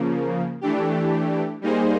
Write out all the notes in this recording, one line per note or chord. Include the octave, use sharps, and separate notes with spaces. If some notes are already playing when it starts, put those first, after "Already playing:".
Already playing: C#3 F3 A#3
E3 A3 D4 G4
G3 A#3 D#4 G#4 C5